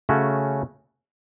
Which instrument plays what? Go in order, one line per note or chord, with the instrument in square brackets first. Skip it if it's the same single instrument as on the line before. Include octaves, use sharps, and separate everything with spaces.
[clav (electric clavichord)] C#3 A3 C#4 F#4